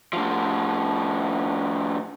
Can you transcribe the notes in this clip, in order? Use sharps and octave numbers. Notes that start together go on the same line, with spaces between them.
A2 F3